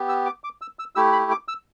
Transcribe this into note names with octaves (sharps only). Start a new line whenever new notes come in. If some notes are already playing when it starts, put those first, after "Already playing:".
Already playing: B3 G4
E6
D6
D6
E6
E6
A3 E4 G4 E6
B5
D6
E6